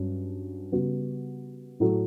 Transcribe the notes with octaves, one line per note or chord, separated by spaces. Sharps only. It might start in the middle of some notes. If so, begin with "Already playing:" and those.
Already playing: G2 F#3 C#4
C#3 G3 B3 F#4
A2 F#3 A3 E4 A4